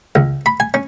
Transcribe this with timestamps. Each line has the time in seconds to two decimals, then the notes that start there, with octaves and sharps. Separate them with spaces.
0.15 C#2
0.46 B5
0.60 G#5
0.74 C#4